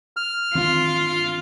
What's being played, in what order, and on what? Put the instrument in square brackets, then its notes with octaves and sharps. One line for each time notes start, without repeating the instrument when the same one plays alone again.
[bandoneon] F6
[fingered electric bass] D#3 C4 D4 [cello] F4